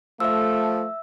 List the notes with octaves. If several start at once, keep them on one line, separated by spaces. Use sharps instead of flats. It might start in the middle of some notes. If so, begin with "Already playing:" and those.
F3 A3 E5 E6